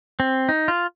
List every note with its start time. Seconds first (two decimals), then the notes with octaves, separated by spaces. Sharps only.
0.20 C4
0.49 D#4
0.68 F4